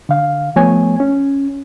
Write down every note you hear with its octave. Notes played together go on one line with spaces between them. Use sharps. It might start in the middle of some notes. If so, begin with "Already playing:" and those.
D3 F5
F3 A3 B3 C#5 G#5
C#4